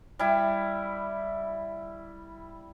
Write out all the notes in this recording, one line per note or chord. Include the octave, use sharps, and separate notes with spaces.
G3 E4